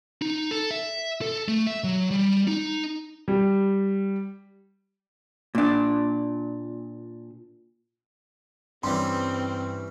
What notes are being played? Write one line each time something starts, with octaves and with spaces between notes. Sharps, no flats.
D#4
A4
E5
A4
A3
E5
F#3
G3
D#4
G3
A#2 D4
G2 E3 G3 C4 C#4 C6